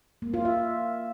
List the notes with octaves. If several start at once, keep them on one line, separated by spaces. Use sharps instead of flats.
A#3
F4
E5